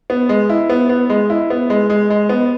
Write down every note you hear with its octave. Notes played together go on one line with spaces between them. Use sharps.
B3
G#3
E4
B3
B3
G#3
E4
B3
G#3
G#3
G#3
B3